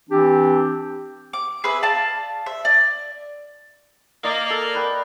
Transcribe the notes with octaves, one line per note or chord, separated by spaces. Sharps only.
E3 C4 D4 G4
D6
G#4 B4 E5
D5 F5 A5
E5
D5
A#3 D5 D#5
A4
B4 G5